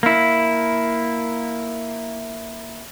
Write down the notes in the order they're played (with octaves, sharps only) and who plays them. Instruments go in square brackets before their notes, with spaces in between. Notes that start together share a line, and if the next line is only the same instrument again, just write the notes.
[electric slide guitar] A#3 E4